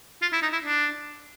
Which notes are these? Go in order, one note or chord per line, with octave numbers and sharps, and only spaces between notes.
F4
E4
D#4
E4
D4